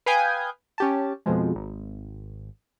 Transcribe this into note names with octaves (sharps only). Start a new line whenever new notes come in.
B4 F5 G5 G#5 D#6 G6
C#4 G4 A5
F2 B2 F3 G#3
G#1